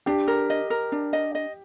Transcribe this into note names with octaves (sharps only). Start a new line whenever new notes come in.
D4 G4
A#4
D#5
A#4
D4
D#5
D#5